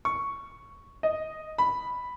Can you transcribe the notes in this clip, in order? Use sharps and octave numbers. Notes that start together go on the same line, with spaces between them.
C#6
D#5
B5